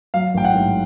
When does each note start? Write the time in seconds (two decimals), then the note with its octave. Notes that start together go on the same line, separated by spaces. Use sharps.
0.14 F#3 F5
0.34 A1 G5
0.44 F#5
0.54 G#2